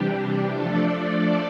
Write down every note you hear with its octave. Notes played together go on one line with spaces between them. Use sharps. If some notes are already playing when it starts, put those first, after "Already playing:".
Already playing: C3 E3 G3 D4 G4
F3 A3 D4 A4 D5